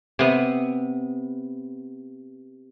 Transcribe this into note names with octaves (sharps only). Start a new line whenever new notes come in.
C3 B3